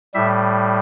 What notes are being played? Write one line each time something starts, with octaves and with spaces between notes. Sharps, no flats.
A2 G3 E5